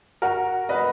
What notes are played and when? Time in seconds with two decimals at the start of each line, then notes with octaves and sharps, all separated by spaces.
0.22 F#4 A#4
0.69 B4 D#5